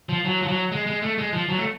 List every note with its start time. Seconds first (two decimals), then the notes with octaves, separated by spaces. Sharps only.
0.09 F3
0.25 F#3
0.42 F3
0.48 F#3
0.72 G#3
0.87 G#3
1.02 A3
1.18 G#3
1.33 F3
1.49 F#3
1.58 A3